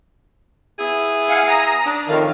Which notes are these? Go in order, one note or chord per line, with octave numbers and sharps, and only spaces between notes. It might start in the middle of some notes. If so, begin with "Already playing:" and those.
B3 E4 G#4
F5 F#5 G#5
A#5 D#6
D4
F2 A2 D#3 F5